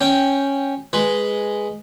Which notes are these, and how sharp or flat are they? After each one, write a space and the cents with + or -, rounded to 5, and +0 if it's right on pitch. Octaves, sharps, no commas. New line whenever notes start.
C#4 -5 G5 +0
G#3 +0 B4 +0